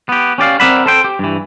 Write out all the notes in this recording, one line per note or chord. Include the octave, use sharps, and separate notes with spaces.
B3 G4
C#4 G4 D5 F5
C4 A#4 D5 E5 F#5 B5
A4 C5 G5
G4
G2 E3